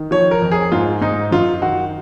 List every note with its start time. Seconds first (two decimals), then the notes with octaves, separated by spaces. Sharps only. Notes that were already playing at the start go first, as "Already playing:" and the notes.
Already playing: D#3
0.11 F3 C#5
0.31 A#4
0.42 F2
0.52 G#4
0.72 G#2 F4
1.01 G#2 D#4
1.31 F#2 F4
1.62 D#3 F#4